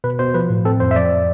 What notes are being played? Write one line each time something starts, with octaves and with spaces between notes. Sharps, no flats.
B2 B4
B2 C5
F3 B4
A2
C4 A4
F2 C5
E5
F3 D5